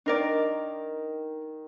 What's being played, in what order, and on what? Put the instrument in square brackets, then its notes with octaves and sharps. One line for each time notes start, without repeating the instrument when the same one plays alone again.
[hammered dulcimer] D#3 [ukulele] D4 A#4 D5